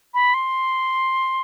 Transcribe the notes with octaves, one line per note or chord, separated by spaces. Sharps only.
B5
C6